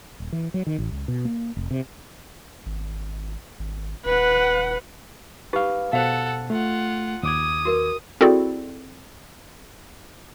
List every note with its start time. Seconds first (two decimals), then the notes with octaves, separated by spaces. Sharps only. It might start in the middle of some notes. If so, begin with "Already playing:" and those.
0.20 D#1
0.32 E3
0.54 F#3
0.67 D#3
0.78 A1
0.92 C#2
1.08 B2
1.25 A#3
1.57 F1
1.71 C3
2.66 G#1
3.59 G#1
4.05 D#1 B4 F#5
5.53 D#4 G4 B4 F5
5.93 B2 A4 C5 F5 F#5
6.50 A3 F4 F#5
7.23 D#2 D6 D#6 G#6
7.65 F#4 A#4 B4
8.21 C4 E4 F#4 G#4 A4 D5